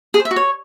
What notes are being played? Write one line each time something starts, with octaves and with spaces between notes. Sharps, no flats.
G#4
C5
E5
F#4
C#5